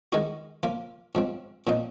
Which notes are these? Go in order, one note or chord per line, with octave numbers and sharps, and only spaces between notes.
D#3 G#3 D#4 F#4
F3 A#3 F4
G#2 F3 C4
A#2 F3 C4 D#4